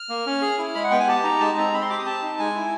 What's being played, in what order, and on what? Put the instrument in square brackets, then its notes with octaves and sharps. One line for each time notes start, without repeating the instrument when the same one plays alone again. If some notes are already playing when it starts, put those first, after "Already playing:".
Already playing: [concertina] F6
A#3
C#4
G#4
E4
G#3 B5
F#5
B3 G5
G#5
G4 A5
D#4 A#5
G#3 A5
C4 A#5
C4 B5
C6
G4 D6
D#6
C4 A5
D#4
G#3 G#5
E4